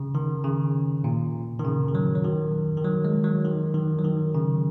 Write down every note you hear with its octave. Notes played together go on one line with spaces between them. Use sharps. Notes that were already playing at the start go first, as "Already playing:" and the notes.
Already playing: C#3
D#3
C#3
A#2
D#3
C#3
D#3
F#3
F#3
D#3
D#3
F#3
G#3
F#3
D#3
D#3
F#3
D#3
C#3